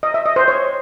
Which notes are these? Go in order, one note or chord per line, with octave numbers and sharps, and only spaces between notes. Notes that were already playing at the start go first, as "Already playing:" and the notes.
D#5
E5
D#5
C5
C#5